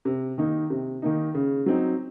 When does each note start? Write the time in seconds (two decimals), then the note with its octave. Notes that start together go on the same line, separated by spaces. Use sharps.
0.05 C3
0.38 D#3 A#3 D#4
0.70 C3
1.02 D#3 A#3 D#4
1.34 C#3
1.66 F#3 C4 D#4